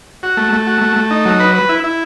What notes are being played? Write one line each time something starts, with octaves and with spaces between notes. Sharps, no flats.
F#4
A3
A3
F#4
A3
A3
D#4
F#3
B4
B4
E4
E4